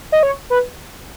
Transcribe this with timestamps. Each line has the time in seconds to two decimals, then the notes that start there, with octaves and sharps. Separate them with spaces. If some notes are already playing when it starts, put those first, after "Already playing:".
0.12 D#5
0.23 C#5
0.50 B4